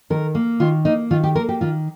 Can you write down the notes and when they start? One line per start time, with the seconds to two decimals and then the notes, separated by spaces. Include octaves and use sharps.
0.10 D#3 A#4
0.35 A#3
0.60 D#3 F4
0.85 A#3 D#4
1.11 D#3 F4
1.24 G4
1.36 A#3 A#4
1.49 G4
1.61 D#3 F4